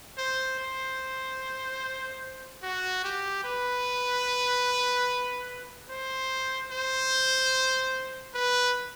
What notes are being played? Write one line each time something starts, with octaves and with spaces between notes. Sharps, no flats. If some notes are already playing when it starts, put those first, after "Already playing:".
C5
C5
F#4
G4
B4
C5
C5
B4